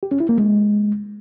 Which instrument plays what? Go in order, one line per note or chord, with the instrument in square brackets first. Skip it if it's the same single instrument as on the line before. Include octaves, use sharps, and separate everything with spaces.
[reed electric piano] G4
C#4
E4
A#3
G#3